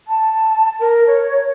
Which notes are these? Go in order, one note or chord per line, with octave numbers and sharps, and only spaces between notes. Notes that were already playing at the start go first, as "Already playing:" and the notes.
A5
A#4
C#5